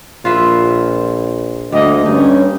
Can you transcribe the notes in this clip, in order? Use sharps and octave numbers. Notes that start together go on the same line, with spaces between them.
A#1 F4 B4 E5
D2 G3 A#3 D#5
G2 C#4 D#4